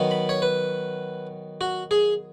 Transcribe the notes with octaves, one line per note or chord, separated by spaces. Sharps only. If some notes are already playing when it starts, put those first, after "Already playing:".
Already playing: D#3 F#3 B3
B5
C#5
B4
F#4
G#4